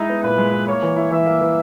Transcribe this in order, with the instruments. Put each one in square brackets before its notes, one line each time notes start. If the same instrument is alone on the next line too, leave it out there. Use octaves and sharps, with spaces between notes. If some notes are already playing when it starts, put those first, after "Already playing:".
Already playing: [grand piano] G#3 E4 [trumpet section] D#4
[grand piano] B3
[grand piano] A#2 [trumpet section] B4
[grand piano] G#3
E4
[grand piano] A#3 [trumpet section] C#5
[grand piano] E3
E4
[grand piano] E3 [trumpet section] E5
[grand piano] A#3
E3